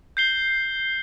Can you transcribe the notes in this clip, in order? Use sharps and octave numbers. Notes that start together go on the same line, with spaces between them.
G6 C7 G7